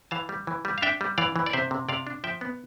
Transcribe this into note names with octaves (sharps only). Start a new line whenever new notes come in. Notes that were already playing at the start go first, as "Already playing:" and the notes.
E3 F5 A5
G3
E3
G3
F5
D4 E5 G5
G3
E3 D5 F5
E3
D5
C3 C5 E5
C3
C3 D5 F5
D4
F3 E5 G5
B3